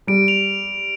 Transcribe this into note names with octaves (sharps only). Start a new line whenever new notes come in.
G3 D7
F7